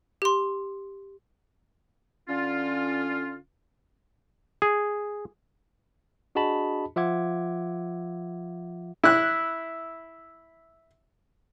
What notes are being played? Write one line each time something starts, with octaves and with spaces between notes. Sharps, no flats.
G4 C6
D3 C#4 F4
G#4
D4 F#4 G#4 D#5 A5 B5
F3 F4 E5 F#5 D6 G#6
E4 F#6